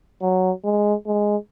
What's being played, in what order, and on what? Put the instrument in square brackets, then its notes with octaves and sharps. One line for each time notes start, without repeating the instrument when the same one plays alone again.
[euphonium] F#3
G#3
G#3